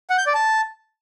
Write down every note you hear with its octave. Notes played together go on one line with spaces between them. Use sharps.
F#5
G6
D5
A5